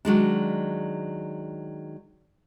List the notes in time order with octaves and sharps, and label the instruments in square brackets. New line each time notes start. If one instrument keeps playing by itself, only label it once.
[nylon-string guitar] D#3 F#3 G#3 D4